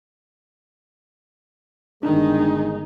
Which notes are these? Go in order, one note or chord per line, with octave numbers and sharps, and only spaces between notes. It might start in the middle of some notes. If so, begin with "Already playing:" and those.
G1 D#3 G#3 D4 D#4